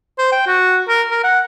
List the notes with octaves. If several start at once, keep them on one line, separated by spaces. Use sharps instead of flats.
C5
G5
F#4
A#4
A#4
F#5